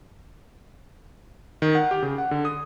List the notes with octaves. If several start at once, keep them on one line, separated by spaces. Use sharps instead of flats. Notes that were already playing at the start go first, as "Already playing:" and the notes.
D#3
F#5
G4
C#3
F#5
D3
D#6